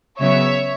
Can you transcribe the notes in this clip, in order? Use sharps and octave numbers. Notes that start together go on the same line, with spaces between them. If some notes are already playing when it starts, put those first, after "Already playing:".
C#3 F#3 B3 C#5 E5